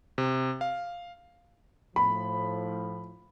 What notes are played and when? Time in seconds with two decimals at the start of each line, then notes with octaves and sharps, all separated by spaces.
0.18 C3
0.61 F5
1.96 A2 F3 B5